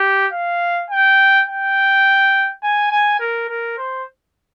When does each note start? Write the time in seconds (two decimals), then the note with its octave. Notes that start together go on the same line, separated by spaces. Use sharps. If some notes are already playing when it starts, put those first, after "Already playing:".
Already playing: G4
0.32 F5
0.90 G5
1.48 G5
2.63 G#5
2.90 G#5
3.19 A#4
3.48 A#4
3.78 C5